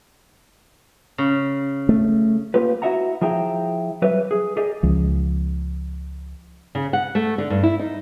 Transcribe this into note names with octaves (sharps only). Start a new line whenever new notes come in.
C#3
A3
A#3 F4 G4 B4
E4 F#4 D#5 E5 F#5 A#5
F3 E4 G#4 E5 G5 A#5
F#3 G3 B4 E5
G#4
G4 G#4 A#4 D5 D#5
C#2 F3
C#3
F#5
A3
D3
G2
E4
D#4